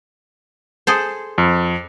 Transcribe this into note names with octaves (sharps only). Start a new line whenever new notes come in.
G#4 A4 C5
F2